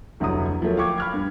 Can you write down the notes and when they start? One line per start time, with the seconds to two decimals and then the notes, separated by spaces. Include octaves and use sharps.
0.20 F1 D2 F#3 E4 A#5 D#6
0.62 F3 F#3 A3 A#3
0.77 F5 G5 C#6 D6 G#6
0.98 B5 F6 G#6
1.14 G2